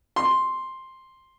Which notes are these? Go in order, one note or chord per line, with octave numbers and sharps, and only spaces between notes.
C6